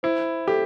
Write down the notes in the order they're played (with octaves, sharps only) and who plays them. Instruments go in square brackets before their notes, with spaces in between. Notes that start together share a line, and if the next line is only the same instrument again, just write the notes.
[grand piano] E4 [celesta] C5
[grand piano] G4 [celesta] A4